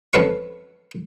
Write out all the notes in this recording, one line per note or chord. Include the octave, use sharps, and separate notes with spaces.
F2 C#4 A4 B4 F5 C#6